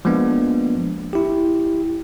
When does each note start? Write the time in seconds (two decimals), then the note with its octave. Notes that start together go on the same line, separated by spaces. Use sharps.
0.05 F3 G#3 A#3 B3 D4
1.13 E4 G4